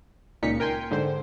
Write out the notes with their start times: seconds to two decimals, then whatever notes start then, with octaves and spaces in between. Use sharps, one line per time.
0.42 C#2 A#2 D#4 B6 C#7
0.60 A#4 G5 G#5 C6
0.91 G#2 D3 C5